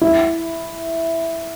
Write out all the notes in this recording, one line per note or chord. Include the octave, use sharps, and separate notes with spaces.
E4